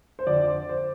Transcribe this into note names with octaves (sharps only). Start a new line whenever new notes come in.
C5
F2 D3 F3 D5
C5